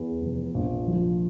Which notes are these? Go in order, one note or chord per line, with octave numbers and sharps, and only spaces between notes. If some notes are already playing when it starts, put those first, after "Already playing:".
Already playing: E2
F1
A#1
F3